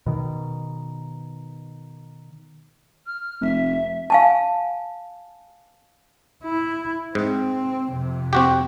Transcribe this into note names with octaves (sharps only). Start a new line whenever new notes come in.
B2 D#3
F6
F1 E5
F5 G#5 A5
E4
G#2 C4
F2 C3
C4 F#4 G4